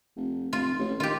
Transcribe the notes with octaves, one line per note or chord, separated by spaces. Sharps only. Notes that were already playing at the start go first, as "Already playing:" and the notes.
F1
F1 F4
A1
D#3 F4 G4